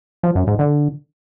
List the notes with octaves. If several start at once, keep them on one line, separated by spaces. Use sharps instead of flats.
F3
F#2
G#2
D3